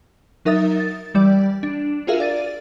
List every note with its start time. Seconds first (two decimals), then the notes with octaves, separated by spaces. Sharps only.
0.45 F#3 D#4 A#4 E5 D#6 A6
0.80 A6
1.14 E3 G3 D5
1.63 D4
2.07 F4 F#4 G#4 A#4 E5 F5
2.20 D5 A6 D#7